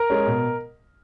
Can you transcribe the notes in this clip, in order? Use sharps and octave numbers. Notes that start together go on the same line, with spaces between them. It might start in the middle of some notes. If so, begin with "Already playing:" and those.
Already playing: A#4
G#3 C#4
B2